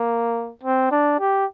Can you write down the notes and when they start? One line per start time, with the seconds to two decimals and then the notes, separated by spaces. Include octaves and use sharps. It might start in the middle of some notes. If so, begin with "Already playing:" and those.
Already playing: A#3
0.63 C4
0.91 D4
1.20 G4